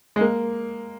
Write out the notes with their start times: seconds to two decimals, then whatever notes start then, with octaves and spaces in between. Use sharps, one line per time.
0.16 G#3
0.21 A#3